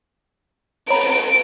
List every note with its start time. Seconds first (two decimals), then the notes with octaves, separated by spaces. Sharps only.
0.90 C#5 A#5 B5 D7